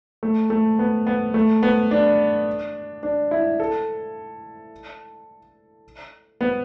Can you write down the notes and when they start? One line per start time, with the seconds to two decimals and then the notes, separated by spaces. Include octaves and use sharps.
0.23 A3
0.50 A3
0.79 B3
1.07 B3
1.34 A3
1.63 B3
1.91 D4
3.03 D4
3.31 E4
3.60 A4
6.41 B3